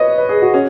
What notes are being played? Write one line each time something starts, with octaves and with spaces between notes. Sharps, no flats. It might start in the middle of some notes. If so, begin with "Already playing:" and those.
Already playing: B4 C#5 D#5
B4
G#4
F#4
C#4